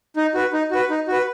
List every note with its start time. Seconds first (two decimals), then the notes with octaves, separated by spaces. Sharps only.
0.17 D#4
0.34 F#4 B4
0.53 D#4
0.71 F#4 B4
0.90 D#4
1.08 F#4 B4